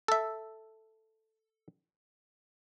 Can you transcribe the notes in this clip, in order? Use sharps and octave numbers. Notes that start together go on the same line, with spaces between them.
A4 E5